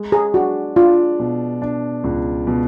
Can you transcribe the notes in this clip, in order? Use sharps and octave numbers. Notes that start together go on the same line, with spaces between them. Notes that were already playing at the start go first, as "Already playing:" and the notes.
Already playing: G#3
G#4
D4 F#4
D4 F4
B2
D4
C#2
B2